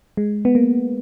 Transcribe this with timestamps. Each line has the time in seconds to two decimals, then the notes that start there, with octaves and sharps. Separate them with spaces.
0.17 G#3
0.45 B3
0.55 A#3